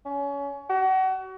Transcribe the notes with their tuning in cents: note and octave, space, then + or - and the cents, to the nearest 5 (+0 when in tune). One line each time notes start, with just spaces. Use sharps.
C#4 +30
F#4 +30